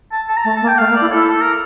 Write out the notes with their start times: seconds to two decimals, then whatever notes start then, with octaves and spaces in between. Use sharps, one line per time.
0.12 A5
0.28 A5
0.37 A#5
0.44 A3 A5
0.57 A5
0.62 A#3
0.68 G5
0.78 A3 F5
0.90 A#3
0.96 E4 D5
1.12 E4 A4
1.29 A4
1.41 A#4